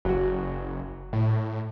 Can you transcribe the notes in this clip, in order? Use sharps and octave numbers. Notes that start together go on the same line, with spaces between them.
F#1 F#3 F#4
A2